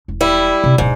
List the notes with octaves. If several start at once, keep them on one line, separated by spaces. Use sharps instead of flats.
E1
G3 E4
C3
D1 G#2 B2